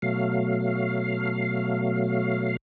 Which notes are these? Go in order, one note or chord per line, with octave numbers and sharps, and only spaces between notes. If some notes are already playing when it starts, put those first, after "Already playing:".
B2 F#3 A3 F5